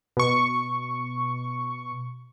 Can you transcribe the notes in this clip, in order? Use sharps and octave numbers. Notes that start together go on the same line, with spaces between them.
B2 C#6